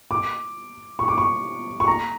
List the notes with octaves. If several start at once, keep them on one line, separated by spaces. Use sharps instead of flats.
D6
C#6
D6
C#6
C#6
A#5